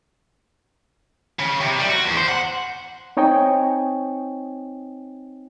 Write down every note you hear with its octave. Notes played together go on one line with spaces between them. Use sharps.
C#3
C3
G3
F#4
E2
C5
F#5
C4 D#4 C#5 D#5 G5 G#5